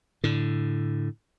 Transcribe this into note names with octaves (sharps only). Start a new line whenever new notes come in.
A2 D3